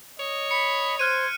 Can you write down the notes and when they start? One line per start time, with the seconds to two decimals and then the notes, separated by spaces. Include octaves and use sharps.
0.20 C#5 D#5
0.51 B5 C#7
0.99 C5 F6 F#6 G#6 D#7